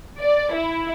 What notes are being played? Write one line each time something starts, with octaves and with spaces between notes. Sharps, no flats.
D5
E4